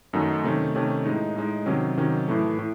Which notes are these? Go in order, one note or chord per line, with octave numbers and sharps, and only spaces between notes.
F#2 D#3 F#3 A3 D#4
C3 D#3 A3 C#4
C3 D#3 A3 C#4
A2 G#3 D#4
A2 G#3 D#4
C3 D#3 F#3 C#4
C3 D#3 F#3 C#4
A2 E3 A3
A2